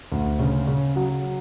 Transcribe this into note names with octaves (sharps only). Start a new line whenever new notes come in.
D2
C#3
C#3
F#3